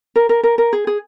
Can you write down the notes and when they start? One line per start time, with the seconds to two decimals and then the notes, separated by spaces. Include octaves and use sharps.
0.16 A#4
0.29 A#4
0.43 A#4
0.58 A#4
0.73 G#4
0.87 G#4